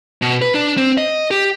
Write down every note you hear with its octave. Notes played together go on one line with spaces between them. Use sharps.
B2
B4
D4
C4
D#5
G4